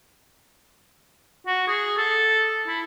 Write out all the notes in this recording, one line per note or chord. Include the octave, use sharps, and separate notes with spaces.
F#4
G#4
A4
E4